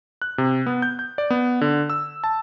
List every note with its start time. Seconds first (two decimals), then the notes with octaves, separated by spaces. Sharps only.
0.22 F#6
0.38 C3
0.66 B3
0.82 G6
0.99 G6
1.18 D5
1.30 B3
1.61 D3
1.90 E6
2.24 A5